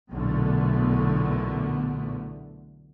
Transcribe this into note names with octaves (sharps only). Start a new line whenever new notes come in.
B1 E2 A#2 D3 A3 B3